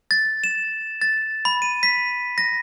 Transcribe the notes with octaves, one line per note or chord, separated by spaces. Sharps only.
A6
E7
A6
B5
D#7
B6
A#6